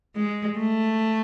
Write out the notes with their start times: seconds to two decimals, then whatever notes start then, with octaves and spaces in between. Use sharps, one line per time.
0.16 G#3
0.59 A3